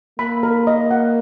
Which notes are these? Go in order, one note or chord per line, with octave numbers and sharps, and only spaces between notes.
A#3 B5
A#4
D#5
F#5